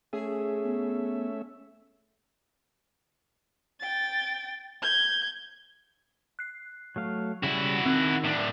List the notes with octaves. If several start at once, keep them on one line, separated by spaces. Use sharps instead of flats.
A3 C#4 G#4 E5
B3
G5 A6
G6 G#6
F#6 C7
F#3 A3 F5
C#3 G3 E4 F#4 E5
D#3 C4 F#5 F#6
A2 D4 E7